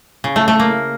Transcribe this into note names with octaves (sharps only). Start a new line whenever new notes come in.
C#3
A3
A3
A#3